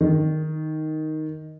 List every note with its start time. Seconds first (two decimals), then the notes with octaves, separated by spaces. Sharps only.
0.01 D#3